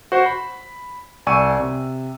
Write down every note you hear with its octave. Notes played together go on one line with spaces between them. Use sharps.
F#4 C5
B5
C2 D5 G#5 C#6 E6 D#7
C3